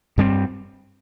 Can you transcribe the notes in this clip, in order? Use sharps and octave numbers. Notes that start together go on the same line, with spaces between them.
G2 G3 C4